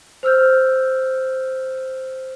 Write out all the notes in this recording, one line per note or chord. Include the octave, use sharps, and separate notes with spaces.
C5 E6 F6 G6